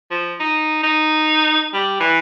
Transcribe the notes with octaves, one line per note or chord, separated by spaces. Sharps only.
F3
D#4
D#4
G3
E3